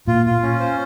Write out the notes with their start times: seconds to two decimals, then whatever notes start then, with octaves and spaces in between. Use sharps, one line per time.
0.08 A#2 F4
0.26 F4
0.43 C#4
0.60 C5